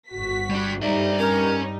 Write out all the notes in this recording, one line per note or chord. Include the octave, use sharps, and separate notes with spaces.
G1 F#4 B6
G3 D4
G2 G3 D#4 D5 E5
C#4 A#4